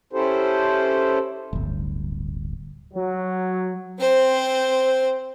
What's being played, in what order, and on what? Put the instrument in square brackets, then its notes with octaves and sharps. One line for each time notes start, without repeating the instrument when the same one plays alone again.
[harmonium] C#4 E4 G4 A4 C5
[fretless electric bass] D1 G1
[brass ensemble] F#3
[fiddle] C4 C5